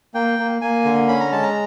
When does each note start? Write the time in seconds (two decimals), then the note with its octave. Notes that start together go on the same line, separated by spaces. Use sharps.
0.14 A#3 G5
0.39 A#3
0.61 A#3 G#5
0.85 D3
1.08 C#4 B5
1.20 A#5
1.32 G#3 A5
1.43 A#5